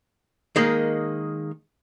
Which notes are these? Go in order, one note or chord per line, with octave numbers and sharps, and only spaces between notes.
D#3 G#3 A#3